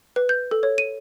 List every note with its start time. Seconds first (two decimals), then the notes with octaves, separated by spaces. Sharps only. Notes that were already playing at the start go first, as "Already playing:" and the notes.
0.16 B4
0.29 G6
0.51 A4
0.63 C#5
0.78 D#7